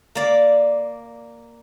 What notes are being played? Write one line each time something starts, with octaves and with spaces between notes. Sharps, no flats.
A#3 D5